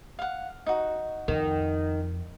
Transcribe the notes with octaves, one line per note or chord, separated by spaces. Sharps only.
F5 F#5
D#4 F#4
F2 D#3